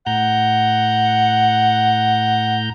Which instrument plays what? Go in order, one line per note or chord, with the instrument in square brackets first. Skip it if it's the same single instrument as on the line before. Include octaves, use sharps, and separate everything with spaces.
[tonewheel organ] A2 A#5 G6 [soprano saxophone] F#5